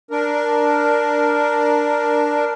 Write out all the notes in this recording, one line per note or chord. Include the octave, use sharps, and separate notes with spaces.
D4 A#4